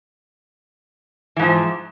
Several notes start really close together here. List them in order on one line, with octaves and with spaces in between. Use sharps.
E3 G#2 F3